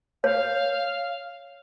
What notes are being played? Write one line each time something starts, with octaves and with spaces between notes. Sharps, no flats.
C#5 F5